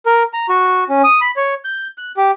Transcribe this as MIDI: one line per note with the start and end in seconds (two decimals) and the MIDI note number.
0.06 0.23 70
0.33 0.47 82
0.49 0.84 66
0.89 1.02 61
1.04 1.20 87
1.21 1.31 83
1.36 1.54 73
1.65 1.87 91
1.98 2.12 90
2.17 2.31 67